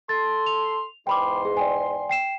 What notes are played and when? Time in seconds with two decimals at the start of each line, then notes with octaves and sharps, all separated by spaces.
0.09 A4 C6 A6
0.46 F7
1.07 E2 G#2 G5 B5 C6 D6
1.45 G#4
1.57 D5 G5 G#5
2.09 G5 C7 E7